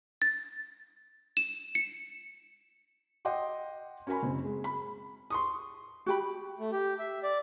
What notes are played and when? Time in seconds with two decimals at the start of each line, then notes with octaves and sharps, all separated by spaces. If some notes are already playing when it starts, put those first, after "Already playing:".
0.22 A6
1.37 E7
1.75 C#7
3.25 D#5 F#5 G5 C6 D6
4.07 C#4 F#4 A#4 G#5 B5
4.23 F#1 C4
4.44 G#3
4.64 B5
5.30 C6 C#6 D#6
6.06 F#4 G4 B5
6.59 A3
6.72 G4
6.99 E5
7.23 D5